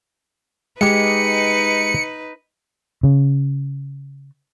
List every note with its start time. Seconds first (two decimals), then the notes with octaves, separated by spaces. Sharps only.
0.81 G#3 D#4 G4 B4 C#7
3.03 C#3